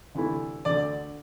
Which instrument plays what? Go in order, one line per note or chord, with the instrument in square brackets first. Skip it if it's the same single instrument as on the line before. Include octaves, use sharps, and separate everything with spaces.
[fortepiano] D2 C3 E3 A3 E4
[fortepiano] D2 D3 A3 [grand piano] D5